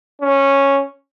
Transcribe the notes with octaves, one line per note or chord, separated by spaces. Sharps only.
C#4